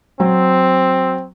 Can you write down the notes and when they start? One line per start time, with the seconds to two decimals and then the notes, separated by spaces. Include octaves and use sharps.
0.20 F#3 C4